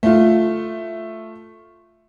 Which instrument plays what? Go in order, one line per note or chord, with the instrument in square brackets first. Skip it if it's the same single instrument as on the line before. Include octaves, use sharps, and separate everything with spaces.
[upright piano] A3 F4